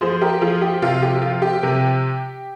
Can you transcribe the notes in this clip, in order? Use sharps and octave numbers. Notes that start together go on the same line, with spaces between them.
F3 G#4 C5
G4 A#4
F3 F4 G#4
G4
C3 F4
G4
F3 F4
G4
C3